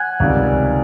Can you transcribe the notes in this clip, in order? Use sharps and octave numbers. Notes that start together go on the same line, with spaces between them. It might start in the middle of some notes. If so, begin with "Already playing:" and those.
Already playing: F#5 G#5
C#2 C3 D#3 G3